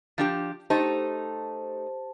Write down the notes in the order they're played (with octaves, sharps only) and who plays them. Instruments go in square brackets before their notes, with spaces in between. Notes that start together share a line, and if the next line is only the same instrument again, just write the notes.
[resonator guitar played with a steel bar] F3 D4 G4
[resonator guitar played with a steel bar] A3 D#4 [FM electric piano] G4 C5 A5